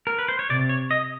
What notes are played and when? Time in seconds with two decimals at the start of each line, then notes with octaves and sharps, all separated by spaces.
0.07 A#4
0.19 B4
0.28 C5
0.39 C#5
0.50 C3 D5
0.69 C#5
0.91 D#5